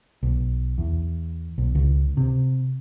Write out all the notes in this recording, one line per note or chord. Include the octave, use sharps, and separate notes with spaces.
B1
E2
B1
C#2
C3